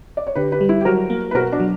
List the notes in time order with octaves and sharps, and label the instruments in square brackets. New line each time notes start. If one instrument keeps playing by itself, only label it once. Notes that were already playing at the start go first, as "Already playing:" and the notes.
[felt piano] D5
C#5
[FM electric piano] D3 [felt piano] G4 B4
[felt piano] G4 B4
[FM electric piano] G3
[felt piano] E4 G4
G4
[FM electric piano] F#3 [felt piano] F#4 A#4
[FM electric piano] A#3
[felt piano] B4
[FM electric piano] B2 [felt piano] F#4 A#4
[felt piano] D4 F#4
[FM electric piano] F#3